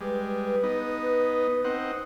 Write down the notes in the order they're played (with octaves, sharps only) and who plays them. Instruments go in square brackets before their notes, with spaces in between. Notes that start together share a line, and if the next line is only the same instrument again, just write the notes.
[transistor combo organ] G3 G#3 [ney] B4
[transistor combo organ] B3 D#4
C4 D#4 F#5